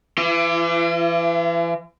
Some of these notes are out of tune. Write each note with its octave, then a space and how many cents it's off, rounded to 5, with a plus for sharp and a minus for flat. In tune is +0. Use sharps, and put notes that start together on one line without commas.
E3 +30 F4 -45